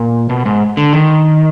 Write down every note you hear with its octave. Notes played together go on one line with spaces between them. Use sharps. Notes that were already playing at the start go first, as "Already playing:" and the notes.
Already playing: A#2
B2
G#2
D3
D#3